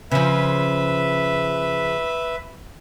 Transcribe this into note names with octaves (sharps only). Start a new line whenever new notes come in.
C#3 F3 B4 E5